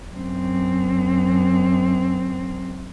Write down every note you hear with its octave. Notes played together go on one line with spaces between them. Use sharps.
F#2 C4